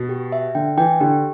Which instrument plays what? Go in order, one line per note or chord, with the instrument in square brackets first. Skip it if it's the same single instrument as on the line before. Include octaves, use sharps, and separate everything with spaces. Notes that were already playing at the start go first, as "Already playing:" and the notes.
Already playing: [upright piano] B2
[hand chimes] G4
E5
[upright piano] D3 [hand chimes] G5
[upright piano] E3 [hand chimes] G5
[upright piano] D3 [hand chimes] G4